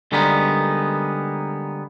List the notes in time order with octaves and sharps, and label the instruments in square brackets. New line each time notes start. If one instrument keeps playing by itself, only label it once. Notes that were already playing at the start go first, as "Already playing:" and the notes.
[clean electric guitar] D3 G3 G#3 A#3 B3 D#4